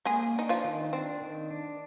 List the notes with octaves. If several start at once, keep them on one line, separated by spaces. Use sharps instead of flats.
G#3 A#3 G#4
D4 D#4
F3 F4
D#3
C4 D4
D#3
D4